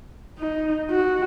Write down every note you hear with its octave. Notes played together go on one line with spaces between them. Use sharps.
D#4
F#4